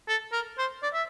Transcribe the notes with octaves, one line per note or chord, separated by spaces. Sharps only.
A4
A#4
C5
D5
E5